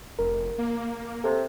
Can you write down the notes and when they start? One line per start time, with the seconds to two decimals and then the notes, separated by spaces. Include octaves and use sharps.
0.19 F1 A#4
0.58 A#3
1.24 C3 A4